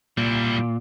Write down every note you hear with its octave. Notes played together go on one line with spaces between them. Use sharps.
A#2 G3 E4